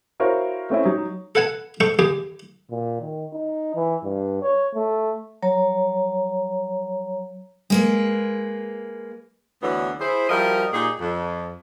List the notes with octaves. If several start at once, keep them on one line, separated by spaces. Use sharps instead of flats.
E4 F#4 A#4 C5 C#5 F5
A3 C4 C#4 E4
F#3 D#4
A4 B4 F#5 G#5 A5
G#2 A4 G5 C#6
D#2 G4 G#4 D6
A#2
D#3
D#4
E3
G2
C#5
A3
F#3 C#5 A#5
G#3 A#3 B4
D2 D3 E3 F#3 B3
E4 G#4 C5
F3 G3 E4 F#4 A#4 D#5
A#2 D#4 G4 G#4
F2